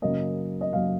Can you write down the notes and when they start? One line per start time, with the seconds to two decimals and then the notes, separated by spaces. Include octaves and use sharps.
0.02 F#2 C#3 F#3 A#3 D#5
0.61 D#5
0.73 F#2 C#3 F#3 A#3 F5